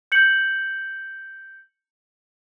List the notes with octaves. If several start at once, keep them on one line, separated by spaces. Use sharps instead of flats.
G6 C#7 F#7